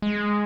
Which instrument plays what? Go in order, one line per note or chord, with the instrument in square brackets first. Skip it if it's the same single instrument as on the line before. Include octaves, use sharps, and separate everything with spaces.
[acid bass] G#3